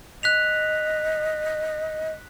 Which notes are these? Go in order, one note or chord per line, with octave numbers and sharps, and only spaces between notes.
D#5 F#6 B6 F7